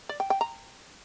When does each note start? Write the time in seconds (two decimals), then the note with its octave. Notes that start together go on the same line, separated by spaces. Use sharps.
0.09 D5
0.20 G5
0.30 G5
0.41 A#5